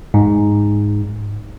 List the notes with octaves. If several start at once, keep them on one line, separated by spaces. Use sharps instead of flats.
G#2